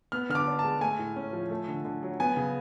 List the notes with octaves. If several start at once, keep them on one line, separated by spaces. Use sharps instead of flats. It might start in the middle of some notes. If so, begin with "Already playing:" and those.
B3 F6
D3 F6
D6
D4
G#3 A5
A3 G#5
A2
C#4
F3
A3
D3
D3
F#3
B3 G#5
C#3